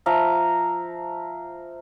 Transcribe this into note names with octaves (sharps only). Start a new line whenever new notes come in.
F3 E5 F5 A#5